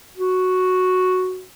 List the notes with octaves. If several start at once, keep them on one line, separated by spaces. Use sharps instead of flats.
F#4